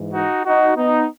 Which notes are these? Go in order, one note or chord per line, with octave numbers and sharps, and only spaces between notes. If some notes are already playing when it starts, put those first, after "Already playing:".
Already playing: G#2 E3
D#4 F#4
D#4 F#4
B3 D#4